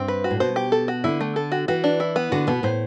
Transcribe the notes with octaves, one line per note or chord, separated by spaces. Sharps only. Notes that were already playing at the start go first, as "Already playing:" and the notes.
Already playing: G2 C4
B4
F#4
A2
B2 C5
G4
A4
F#4
D3 E4
A3
A4
F#4
E3 F#4
D4
E4
B3
D3 F#4
B2 B3
A2 C5